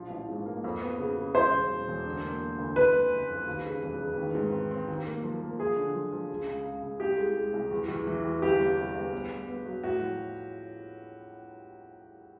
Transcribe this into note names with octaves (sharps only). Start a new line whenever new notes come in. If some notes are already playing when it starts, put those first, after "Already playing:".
Already playing: A#1 F3
A1
G#2
A#3
F2
B3
C#3
C#3
E1 C5
C#3
E1
E1
D3
A#3
A#3
D2
F#1 B4
F#1
F#1
F2
D#2
C#3
E1
C#3
D#3
G#2
C4
C4
D#2
A#3
F3
A#3
F3 G#4
D3
F3
F3
C#3
C#2
C#2
C#2
C2 G4
G#3
G#3
C2
E2
E2
E3
E2
G1 G4
G1
C3
G1
B3
B3
B3
F#3
A2 F#4
F3